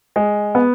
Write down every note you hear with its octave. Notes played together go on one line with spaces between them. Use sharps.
G#3
B3